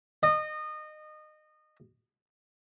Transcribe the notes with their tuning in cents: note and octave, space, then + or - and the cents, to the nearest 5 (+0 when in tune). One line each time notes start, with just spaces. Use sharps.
D#5 -25